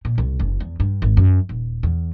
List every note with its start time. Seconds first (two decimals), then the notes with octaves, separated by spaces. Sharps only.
0.05 A#2
0.18 C2
0.40 F#1
0.60 E2
0.80 G2
1.02 G#1
1.17 F#2
1.49 D#1
1.83 E2